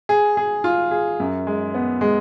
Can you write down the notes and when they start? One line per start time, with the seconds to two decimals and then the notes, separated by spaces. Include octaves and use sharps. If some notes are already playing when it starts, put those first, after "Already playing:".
0.09 G#4
0.37 G#4
0.64 F4
0.91 G#4
1.20 F#2
1.47 G#3
1.74 B3
2.01 G#3